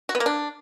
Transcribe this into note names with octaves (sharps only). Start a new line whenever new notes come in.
F#4
B3
A#3
D4